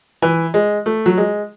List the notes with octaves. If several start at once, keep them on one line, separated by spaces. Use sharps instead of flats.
E3
G#3
A3
F#3
G#3